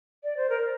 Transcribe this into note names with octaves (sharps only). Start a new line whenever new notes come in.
D5
C5
A#4